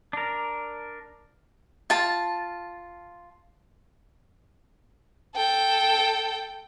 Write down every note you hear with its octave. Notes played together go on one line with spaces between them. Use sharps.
D4 A#4
F4 A5
A4 G5